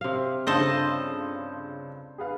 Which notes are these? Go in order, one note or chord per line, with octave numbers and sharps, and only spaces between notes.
C3 F5
G2 C#3 F4 A4 C5 D#5
G#4 B4 F5